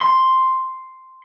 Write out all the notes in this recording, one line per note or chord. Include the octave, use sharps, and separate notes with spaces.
C6